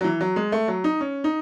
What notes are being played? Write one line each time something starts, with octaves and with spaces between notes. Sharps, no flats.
F#3
E3
F#3
G#3
A3
F#3
D#4
C#4
D#4